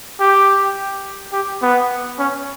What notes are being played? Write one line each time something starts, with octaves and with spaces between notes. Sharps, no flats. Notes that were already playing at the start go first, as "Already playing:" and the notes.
G4
G4
B3
C#4